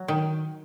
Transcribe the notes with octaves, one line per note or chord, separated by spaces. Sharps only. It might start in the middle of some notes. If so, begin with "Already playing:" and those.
Already playing: F#3
D#3